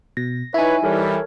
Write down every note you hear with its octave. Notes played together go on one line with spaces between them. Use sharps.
B2 A#6
D#4 E4 B4 C#5 E5 G#5
E3 G3 A4 A#4 C#5